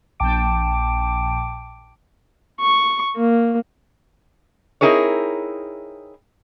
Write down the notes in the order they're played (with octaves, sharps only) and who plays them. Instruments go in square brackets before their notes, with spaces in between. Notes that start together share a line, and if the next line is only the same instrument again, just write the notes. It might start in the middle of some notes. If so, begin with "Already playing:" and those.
[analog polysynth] A#1 G5 A5 D6 D7
[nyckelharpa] C#6
A#3
[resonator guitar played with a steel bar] C4 D#4 E4 G#4 A#4 C#5